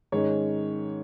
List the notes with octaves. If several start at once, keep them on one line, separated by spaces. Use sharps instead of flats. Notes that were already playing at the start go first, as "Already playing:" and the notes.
G#2 D#3 G#3 C#4 C#5